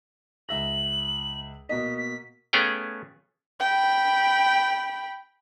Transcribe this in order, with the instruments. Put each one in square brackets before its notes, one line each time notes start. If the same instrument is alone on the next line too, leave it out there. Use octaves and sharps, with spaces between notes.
[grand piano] C#2 E5 A#6 [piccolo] F#7
[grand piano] B2 A#3 D#5 [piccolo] B6
[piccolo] B6
[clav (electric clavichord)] A3 B3 C#4 G#4 F5 G5
[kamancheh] G5 B5